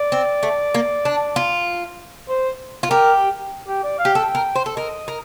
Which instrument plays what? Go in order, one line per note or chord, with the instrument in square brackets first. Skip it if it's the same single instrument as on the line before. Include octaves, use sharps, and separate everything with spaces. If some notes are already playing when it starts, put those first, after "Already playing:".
Already playing: [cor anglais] D5
[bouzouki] C4
A3
A#3
D4
F4
[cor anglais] C5
[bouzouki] F4
[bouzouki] G4 [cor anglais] A#4
[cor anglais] G4
D5
F5
[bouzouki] G4
[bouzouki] A4 [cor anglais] G5
[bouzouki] A#4
C5
A4
[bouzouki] A#4 [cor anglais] D#5
[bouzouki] A#4